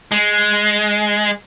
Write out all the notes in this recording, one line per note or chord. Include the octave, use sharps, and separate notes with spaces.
G#3